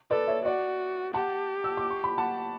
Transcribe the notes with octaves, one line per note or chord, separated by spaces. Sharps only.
A4 B4 D5
C#5 E5
F#4 D5 F#5
G4 F#5 A5
E6
D6
C#6
B5
F#5 A5